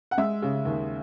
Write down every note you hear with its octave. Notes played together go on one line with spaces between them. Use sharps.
F#5
G#3 E5
C#3
D#2